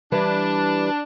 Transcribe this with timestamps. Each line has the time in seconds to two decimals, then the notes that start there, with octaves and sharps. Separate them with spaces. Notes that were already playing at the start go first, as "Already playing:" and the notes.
0.12 E3 G3 D4 B4